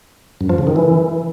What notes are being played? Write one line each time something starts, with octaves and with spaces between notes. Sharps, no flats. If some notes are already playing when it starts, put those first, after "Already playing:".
F#2
F3
C#3
D#3
E3